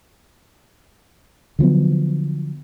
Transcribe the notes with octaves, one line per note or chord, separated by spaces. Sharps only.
D3 F3 F#3 B3